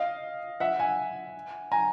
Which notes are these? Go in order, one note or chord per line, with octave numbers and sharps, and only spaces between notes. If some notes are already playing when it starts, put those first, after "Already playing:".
Already playing: D#5 F5
E5 F#5
F#5 G#5
G#5 A#5